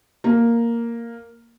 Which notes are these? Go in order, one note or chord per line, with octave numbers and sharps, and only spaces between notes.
A#3